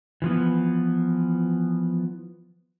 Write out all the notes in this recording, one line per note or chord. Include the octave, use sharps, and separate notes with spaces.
E3 F3 B3